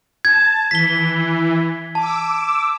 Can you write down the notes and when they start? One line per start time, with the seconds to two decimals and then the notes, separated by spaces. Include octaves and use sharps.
0.25 A5 G#6
0.71 E3 B6 G7
1.95 A5 D6 E6